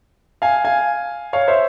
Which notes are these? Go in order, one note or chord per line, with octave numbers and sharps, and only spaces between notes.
F5 G#5
F5 G#5
C#5 F5
C5 E5